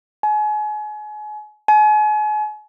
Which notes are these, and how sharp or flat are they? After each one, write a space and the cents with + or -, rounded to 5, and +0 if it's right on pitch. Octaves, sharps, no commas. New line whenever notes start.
G#5 +35
G#5 +40